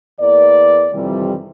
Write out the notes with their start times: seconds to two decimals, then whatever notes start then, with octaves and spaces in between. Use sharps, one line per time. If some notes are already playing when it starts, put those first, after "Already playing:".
0.21 E2 E3 A#3 D5
0.94 F2 C3 D#3 E3 G3